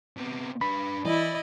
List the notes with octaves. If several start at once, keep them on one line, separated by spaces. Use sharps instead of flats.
C3 B3
D4 B4 B5
E3 E4 D5 D#5